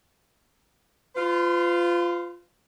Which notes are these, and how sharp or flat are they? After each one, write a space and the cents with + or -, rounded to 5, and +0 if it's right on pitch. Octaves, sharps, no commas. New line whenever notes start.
F4 -5 B4 +45